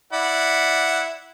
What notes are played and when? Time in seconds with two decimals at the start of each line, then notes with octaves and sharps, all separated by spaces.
0.13 E4 D5 F#5